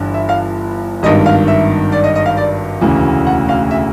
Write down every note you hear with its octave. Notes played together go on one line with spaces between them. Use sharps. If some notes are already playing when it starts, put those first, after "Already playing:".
Already playing: G1 G2 E3
E5
F5
G#1 G2 D#3 D#5
F5
E5
D5
D#5
D#5
F5
D5
E1 D2 C#3 E3
F#5
F5
E5